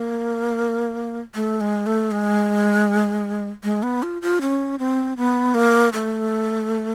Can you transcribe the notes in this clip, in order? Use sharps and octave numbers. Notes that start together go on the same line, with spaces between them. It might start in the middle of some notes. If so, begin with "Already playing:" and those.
Already playing: A#3
A3
G#3
A3
G#3
G#3
B3
F4
F4
C#4
C4
B3
A#3
A3